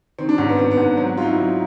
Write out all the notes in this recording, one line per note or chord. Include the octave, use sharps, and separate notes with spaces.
D#3 C4
D4
G#2 C#4
B3
G#2 C4
B3
G#2
B3
F#3 C4
F#4
F#3 D#4 F4
E4
F#3